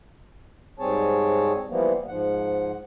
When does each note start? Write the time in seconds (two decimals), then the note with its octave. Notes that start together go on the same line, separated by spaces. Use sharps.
0.79 G#2 G3 C4 G#4 C#5 A5
1.69 E3 F3 G3 A#3 B3
2.08 G#2 F3 F#5